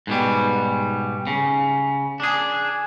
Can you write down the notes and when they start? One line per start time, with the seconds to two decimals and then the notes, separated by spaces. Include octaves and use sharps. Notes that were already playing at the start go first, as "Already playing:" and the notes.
0.07 G#2 B2 G3
1.27 C#3
2.20 D4 G#4